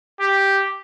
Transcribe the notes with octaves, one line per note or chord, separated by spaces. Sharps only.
G4